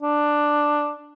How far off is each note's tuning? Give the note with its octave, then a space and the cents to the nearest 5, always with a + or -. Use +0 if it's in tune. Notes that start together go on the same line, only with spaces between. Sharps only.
D4 +5